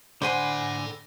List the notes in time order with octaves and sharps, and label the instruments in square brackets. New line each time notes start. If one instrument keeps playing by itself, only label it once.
[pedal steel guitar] D3 G#5 [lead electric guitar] A4 B5 [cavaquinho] C5 F#5 C6